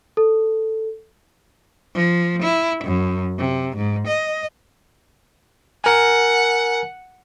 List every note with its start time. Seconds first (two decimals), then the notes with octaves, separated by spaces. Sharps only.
0.17 A4
1.95 F3
2.42 E4
2.84 F#2
3.38 C3
3.77 G#2
4.07 D#5
5.84 A#4 F#5 G#5